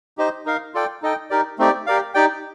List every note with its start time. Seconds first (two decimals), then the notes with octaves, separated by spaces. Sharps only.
0.18 D#4 G4 C5 D#5
0.45 D#4 A#4 F5
0.74 F4 A4 D5 G5
1.02 D#4 A4 D#5 G5
1.30 D#4 G4 A#4 D5
1.58 A3 C4 D#4 G4 D5
1.86 G4 A#4 D5 F5
2.14 D#4 G4 D5 G5